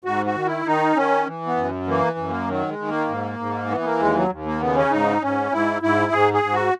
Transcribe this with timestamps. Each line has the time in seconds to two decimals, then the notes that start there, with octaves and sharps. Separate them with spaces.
0.04 G#2 F#4
0.26 F#4
0.35 D#3
0.46 E4
0.66 D#3 D#4
0.96 D#3 C#4
1.26 E3
1.46 B3
1.57 F#2
1.87 E3 A#3
2.18 F#2
2.28 A#3
2.48 D#3 F#3
2.69 G#3
2.78 D#3
2.88 A#3
3.09 G#2
3.39 G#2
3.70 E3 B3
3.80 B3
3.85 A#3
4.00 D#2 G#3
4.15 F#3
4.31 D#2
4.46 A#3
4.60 C#3 B3
4.76 C#4
4.91 G#2 D#4
5.21 G#2 C#4
5.52 G#2 E4
5.82 G#2 E4
6.12 G#2 G#4
6.34 G#4
6.43 G#2
6.53 F#4